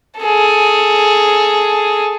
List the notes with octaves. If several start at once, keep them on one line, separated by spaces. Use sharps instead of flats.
G#4 A4